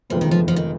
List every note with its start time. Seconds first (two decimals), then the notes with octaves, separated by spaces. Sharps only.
0.10 F1 F2 D3 F3 G#3 B3
0.21 D#3
0.31 F3
0.48 F3
0.56 D#3